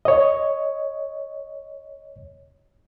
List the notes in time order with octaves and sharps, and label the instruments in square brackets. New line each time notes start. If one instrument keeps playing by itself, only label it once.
[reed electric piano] C#5 D#5